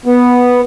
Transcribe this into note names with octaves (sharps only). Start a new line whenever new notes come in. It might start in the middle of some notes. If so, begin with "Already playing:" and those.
B3